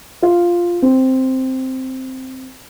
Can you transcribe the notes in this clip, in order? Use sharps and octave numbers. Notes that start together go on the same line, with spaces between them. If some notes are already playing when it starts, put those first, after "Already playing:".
F4
C4